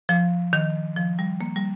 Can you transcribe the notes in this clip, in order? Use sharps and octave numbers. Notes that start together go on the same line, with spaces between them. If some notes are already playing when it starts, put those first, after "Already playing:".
F3
D#3
F3
G3
A#3
G3